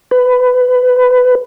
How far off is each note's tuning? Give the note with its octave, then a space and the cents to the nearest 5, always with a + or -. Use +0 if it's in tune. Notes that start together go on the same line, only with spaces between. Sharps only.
B4 +20